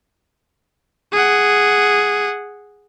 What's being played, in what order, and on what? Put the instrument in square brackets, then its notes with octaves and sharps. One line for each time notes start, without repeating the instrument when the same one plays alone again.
[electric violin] G#4 F#5